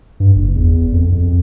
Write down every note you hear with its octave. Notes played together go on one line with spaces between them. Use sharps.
G2
F#1
E2
F2
F2